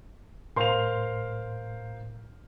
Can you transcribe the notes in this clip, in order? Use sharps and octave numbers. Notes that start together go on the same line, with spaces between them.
A2 A#4 C5 F5 C6 F7